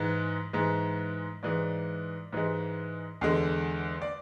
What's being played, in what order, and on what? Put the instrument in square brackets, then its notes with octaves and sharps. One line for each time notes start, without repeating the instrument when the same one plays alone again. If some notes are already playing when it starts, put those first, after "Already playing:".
Already playing: [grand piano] G#2 E3 G#3
G#2 E3 G#3
G#2 E3 G#3 D5
G#2 E3 G#3
E2 D3 G#3
D5